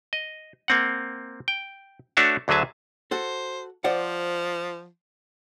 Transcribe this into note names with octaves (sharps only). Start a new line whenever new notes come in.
D#5
A#3 C4 F#5
G5
A3 D4 F#4 C#5 E5 A5
D2 D3 F#3 G#4 E5 A5
F#4 A4 C5
F3 C5 D5 F#5